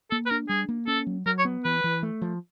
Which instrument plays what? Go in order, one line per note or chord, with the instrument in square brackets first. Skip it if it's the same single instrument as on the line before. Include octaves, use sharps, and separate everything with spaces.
[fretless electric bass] A#3 [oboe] A4
[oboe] B4
[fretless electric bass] D4 [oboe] A#4
[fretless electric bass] G3 [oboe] G#4
[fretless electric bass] A#3
[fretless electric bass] C#4 [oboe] A4
[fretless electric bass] F#3
[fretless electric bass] F#3 [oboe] A#4
[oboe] C#5
[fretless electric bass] B3
[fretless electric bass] E3 [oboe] B4
[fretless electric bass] E3
A3
F3